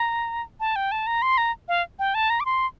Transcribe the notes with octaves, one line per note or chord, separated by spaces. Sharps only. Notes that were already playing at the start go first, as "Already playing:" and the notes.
Already playing: A#5
A5
G5
A5
A#5
C6
A#5
F5
G5
A5
A#5
D6
C6